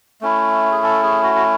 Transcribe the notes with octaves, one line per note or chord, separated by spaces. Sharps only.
A3 C#4 E4
G#4
A4
G#4
F#4
F#4